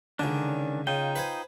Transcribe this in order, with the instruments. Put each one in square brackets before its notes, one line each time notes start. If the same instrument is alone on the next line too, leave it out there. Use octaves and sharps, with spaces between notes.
[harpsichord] C#2 D3 [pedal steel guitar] D#3 C#4 D4
[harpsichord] C#3 [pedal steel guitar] D#4 F4 G5
[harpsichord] B4 C5 G#5